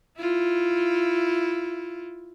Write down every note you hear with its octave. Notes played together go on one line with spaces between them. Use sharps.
E4 F4